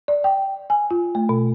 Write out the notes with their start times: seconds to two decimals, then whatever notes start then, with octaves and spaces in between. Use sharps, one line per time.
0.08 D5
0.24 G5
0.70 G#5
0.91 F4
1.15 A3
1.29 B2